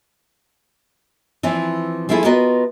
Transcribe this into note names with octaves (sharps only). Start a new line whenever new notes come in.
E3 F3 C4 E4
F3 A3 D4 E4 F4 G#4
B3 F4 F#4 A#4 B4 D#5